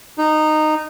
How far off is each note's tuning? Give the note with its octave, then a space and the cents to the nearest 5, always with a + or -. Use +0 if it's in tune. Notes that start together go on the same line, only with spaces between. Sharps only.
D#4 -15